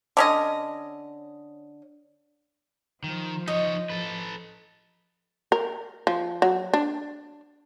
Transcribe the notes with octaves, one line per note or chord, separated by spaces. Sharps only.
D3 C#4 D#5
D#3 F3
D#4 C#5 D#5
A4 B4
A#4
F3
F#3
D4